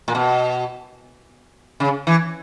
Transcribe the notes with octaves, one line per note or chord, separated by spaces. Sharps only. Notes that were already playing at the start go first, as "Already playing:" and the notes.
A#2
B2
C#3
E3